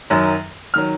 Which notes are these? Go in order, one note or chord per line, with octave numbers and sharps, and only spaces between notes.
F#2 D#3 F#3
D#3 F#3 F6